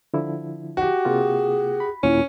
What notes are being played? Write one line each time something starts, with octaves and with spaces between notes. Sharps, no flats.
D3 F3 E4
F#4 G4
C3 A#3 F4 G#4
B5
D#2 A#2 C#4 E4